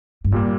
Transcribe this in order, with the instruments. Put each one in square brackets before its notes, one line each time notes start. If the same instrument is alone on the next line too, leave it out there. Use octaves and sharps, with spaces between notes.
[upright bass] G2
[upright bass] F#2 [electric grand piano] A#2 G3 A#3